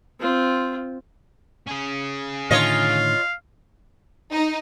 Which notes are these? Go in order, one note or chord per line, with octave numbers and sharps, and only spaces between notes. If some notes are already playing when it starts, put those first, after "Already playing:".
C4 F4
C#4 G#4
A2 D3 D#3 F4 C#5 D#5 F5
D#4